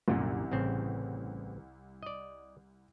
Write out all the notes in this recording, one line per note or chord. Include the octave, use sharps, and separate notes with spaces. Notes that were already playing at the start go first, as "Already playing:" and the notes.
C2 F#2 A#2 D3
A1 C#3 C4
D5 D#5